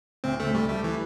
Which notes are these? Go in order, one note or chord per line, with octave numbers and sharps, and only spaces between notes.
D2 C4
A3
D2
G3
G3 A3
E3